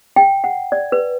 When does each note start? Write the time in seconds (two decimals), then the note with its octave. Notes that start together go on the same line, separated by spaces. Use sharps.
0.16 G5
0.44 F#5
0.72 D5
0.92 B4